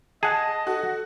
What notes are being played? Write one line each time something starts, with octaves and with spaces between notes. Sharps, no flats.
G#4 D#5 F#5 A5
F#4 A4